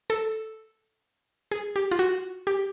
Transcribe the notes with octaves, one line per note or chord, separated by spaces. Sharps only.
A4
G#4
G4
F4
F#4
G4